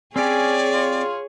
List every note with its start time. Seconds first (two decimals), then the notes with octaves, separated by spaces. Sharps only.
0.16 C4 C#4 G4 G#4 C#5 D5
0.73 F4